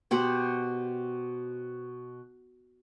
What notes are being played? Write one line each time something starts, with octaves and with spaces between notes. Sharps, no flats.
B2 G4 C5 F#5